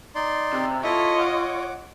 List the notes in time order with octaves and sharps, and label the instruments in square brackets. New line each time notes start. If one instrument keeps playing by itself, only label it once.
[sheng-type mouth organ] D#4 D5 C6
[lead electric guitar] C3
[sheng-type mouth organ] E4 A4 E5 [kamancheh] F4 D#5 [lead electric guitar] C#5
[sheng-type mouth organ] F#5 D6